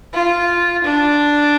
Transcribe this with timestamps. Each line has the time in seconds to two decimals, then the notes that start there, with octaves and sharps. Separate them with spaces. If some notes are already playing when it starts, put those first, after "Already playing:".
0.13 F4
0.84 D4